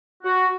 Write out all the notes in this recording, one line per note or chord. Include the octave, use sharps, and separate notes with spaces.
F#4